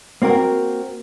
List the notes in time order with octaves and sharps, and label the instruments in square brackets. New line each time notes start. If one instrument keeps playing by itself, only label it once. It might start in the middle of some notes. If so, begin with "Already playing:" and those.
[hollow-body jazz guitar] A#3 C4 F#4 A#4